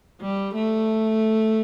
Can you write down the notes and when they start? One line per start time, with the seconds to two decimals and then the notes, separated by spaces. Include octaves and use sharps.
0.21 G3
0.55 A3